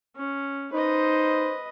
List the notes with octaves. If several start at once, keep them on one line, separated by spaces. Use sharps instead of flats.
C#4
D#4 B4 C5 D#5